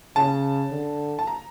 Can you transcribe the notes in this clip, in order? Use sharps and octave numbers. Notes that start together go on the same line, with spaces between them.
C#3 A5
D3
A5
A#5